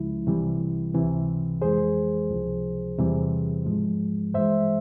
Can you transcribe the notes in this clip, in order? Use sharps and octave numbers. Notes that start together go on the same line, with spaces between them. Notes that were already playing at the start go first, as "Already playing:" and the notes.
Already playing: C#2 C#3 F3 G#3 E4
C2 C3 E3 G3
C#2 C3 E3
F2 E3 G#3 G#4 C5
C#2 C3 F3
E2 C3 E3 G3
G#2 F3 G#3
G2 E3 G#3 C5 E5